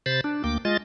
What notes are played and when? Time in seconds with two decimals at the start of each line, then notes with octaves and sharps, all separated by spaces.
0.06 C3 C5 B5 A6
0.24 D4
0.44 D2 A#3 G5 D6
0.65 G#3 F4 D#5 A6